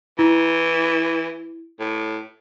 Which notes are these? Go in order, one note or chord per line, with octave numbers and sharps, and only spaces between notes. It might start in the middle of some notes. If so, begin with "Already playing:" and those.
E3 E4
A2